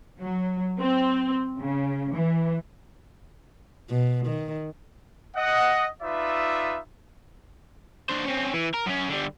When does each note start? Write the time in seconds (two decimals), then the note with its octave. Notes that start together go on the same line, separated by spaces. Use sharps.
0.19 F#3
0.79 C4
1.59 C#3
2.14 E3
3.90 B2
4.27 D#3
5.36 D#5 F#5
6.01 D#4 F4 B4 D5 E5
8.09 D4 C5
8.25 C4 C#4
8.54 E3
8.74 A#4
8.87 F#2 C#4
9.09 D3 G3